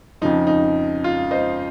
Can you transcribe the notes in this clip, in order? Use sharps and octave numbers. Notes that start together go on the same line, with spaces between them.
F2 C#3 F3 D#4
D#4
F4
C5 D#5